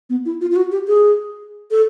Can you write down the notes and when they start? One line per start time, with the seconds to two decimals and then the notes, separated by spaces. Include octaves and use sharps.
0.10 B3
0.26 E4
0.41 F4
0.51 F4
0.56 F#4
0.72 G4
0.88 G#4
1.71 A4